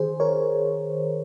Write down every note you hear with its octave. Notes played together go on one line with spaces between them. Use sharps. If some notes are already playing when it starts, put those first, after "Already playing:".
Already playing: D#3 G#4 C5
A#4 C#5